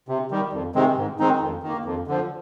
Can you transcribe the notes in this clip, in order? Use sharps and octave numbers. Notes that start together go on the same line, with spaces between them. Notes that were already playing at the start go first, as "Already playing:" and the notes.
C3
D#3 G3
F2
C3 D#3 G#3 C4
G#2
D#3 G#3 C4 D#4
F2
D#3 A#3
F2
D3 F3